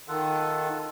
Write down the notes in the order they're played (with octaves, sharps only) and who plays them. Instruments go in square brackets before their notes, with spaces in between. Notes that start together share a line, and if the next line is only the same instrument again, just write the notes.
[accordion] D#3 [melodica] F4 A4 F#5